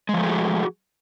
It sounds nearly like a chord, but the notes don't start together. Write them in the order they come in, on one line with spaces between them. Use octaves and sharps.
G#3 F3 A3 G#4 F#4